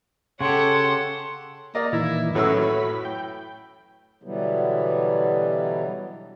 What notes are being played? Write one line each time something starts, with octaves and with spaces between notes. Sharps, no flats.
C#3 G4 A4 C#5 F#5 C6
A#3 D5 D#5 A#5
A#2 D#3 E3 E4
F#2 A2 F#3 F#4 B4 C#5 E6
B5
G5
B2 D3 E3 F#3 G3 B3